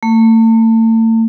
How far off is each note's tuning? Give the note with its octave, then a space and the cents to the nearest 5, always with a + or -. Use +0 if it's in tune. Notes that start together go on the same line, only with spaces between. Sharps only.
A3 +40